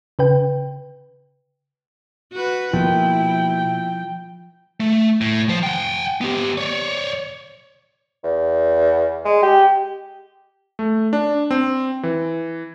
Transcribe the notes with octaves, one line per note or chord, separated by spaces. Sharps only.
C#3 B4 G5
F#4 B4
B2 F3 A#3 E4 G5
A3
A2
F3 C5
F#5 G5
B3 G4
C#5 D5
E2
G#3
G4
A3
D4
C4
E3